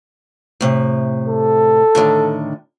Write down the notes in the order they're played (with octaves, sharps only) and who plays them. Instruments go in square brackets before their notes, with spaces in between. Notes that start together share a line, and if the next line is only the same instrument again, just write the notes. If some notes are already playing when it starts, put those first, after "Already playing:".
[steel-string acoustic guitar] A2 C3
[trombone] A4
[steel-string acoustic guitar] A2 D3 D#3